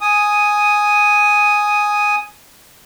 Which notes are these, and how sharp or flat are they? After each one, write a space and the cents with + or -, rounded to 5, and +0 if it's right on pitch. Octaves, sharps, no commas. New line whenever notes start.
G#5 +0 D#6 +0